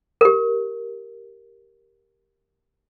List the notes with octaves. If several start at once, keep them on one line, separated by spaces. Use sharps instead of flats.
G4 A#4